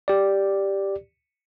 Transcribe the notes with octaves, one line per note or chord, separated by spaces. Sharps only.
G4 D5